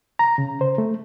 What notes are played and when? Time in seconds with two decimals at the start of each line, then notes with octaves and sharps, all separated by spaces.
0.19 A#5
0.38 C#3
0.61 C5
0.78 A3